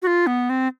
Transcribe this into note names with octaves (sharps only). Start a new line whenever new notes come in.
F#4
F4
B3
C4